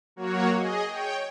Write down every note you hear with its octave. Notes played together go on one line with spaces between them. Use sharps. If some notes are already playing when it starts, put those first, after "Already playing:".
F#3 A#3 F#4 C#5
G#4 D#5
C#5 G5